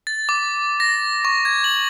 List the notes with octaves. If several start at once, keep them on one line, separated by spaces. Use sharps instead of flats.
A6
D6
A#6
C#6
G#6
F#7